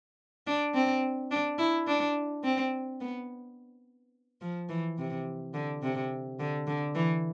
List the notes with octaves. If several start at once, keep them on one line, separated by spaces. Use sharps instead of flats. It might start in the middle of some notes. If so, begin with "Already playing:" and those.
D4
C4
D4
E4
D4
C4
B3
F3
E3
C3
D3
C3
D3
D3
E3